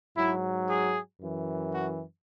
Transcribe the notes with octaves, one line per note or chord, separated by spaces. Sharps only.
G#2 F#3 E4
G#4
F#2 E3
F#4